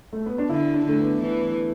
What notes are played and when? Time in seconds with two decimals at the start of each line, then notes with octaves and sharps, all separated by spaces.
0.13 A3
0.26 B3
0.38 D4
0.49 D3 E4
0.74 D4
0.85 D3 A3
0.98 B3
1.22 E3 B3